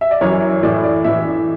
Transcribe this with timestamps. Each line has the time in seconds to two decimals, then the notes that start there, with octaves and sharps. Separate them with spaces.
0.01 E5
0.11 D5
0.21 F#2 E3 C#5
0.63 A2 E3 D5
0.84 D5
1.04 A2 E3 E5